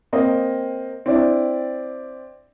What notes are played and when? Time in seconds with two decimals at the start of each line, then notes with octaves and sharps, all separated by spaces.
0.13 A#3 C4 D#5
1.06 C4 D4 E4 D5